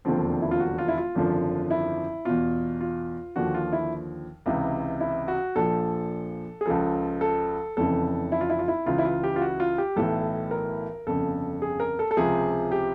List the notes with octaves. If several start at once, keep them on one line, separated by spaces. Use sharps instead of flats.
E1 D#2 D3 F3 C4
E4
F4
F#4
F4
E4
F4
G#1 F#2 D3 F3
E4
E2 B2 F4
F4
D#2 D3 F3 F#4
F4
E4
C#2 C3 E3
E4
F#4
A#1 A#2 F3 A4
G#4
C#2 C#3 F3 A4
A4
F1 F2 C#3 E3 A4
E4
F4
E4
F4
E4
C#2 C#3 E3 F4
E4
F4
G4
F4
F#4
F4
G4
B1 A2 E3 A4
A#4
G1 F2 C#3 A4
G#4
A#4
A4
A4
C#2 C3 F3 G#4
G4